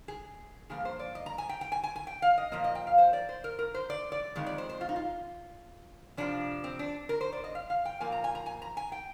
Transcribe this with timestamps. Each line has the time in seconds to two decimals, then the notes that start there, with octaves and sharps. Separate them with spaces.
0.08 G#4
0.69 G2 F3 A#3 G#4
0.85 C5
0.99 D5
1.15 D#5
1.26 A#5
1.38 G#5
1.49 G5
1.61 G5
1.72 G#5
1.84 G#5
1.96 G#5
2.07 G5
2.22 F5
2.38 D#5
2.52 A#2 F3 A#3 D#5
2.64 D#5
2.75 G5
2.87 F5
2.98 C5
3.13 D5
3.29 C5
3.44 A#4
3.59 A#4
3.74 C5
3.90 D5
4.12 D5
4.36 F2 D#3 G#3
4.46 D5
4.58 C5
4.69 C5
4.81 F4
4.89 D#4
4.96 F4
6.17 F2 C3 F3 D4
6.64 C4
6.79 D4
7.09 A#4
7.21 C5
7.32 D5
7.44 D#5
7.55 F5
7.70 F5
7.85 G5
8.00 A#2 F3 A#3 G#5
8.12 A#5
8.24 G#5
8.35 A#5
8.46 G#5
8.62 A#5
8.77 G#5
8.92 G5